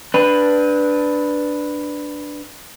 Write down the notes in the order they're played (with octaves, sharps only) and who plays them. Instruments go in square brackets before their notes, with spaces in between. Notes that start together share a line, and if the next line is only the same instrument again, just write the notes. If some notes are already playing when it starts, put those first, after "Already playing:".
[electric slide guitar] D4 B4